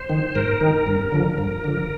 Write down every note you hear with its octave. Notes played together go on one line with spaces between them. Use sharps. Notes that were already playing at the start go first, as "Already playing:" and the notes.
Already playing: C5
D#3
G#2 A#4
D#3
G2
D3 F3
G2
D3 F3